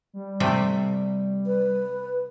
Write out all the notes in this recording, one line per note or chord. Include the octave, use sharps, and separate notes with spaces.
G3
C3 A3 G5
B4